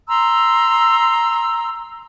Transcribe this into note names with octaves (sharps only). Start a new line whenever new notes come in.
A#5 C6 E6